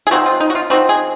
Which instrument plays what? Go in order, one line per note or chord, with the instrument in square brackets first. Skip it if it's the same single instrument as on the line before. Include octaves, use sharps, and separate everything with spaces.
[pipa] G#4
F3 C4 D#4 F#4
F4
D#4
F#4
F4
F3 C4 D#4 F#4
G#4